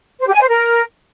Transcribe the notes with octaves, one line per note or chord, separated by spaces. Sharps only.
C5
G4
G#5
C5
A#4